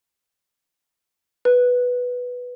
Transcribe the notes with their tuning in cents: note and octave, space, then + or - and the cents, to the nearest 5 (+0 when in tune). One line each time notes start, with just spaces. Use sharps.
B4 +0